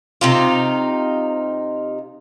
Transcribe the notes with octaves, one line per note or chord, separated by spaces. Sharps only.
C3 D#4 F4